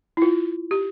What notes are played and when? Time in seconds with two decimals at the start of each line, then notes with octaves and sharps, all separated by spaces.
0.17 E4
0.22 F4
0.71 G4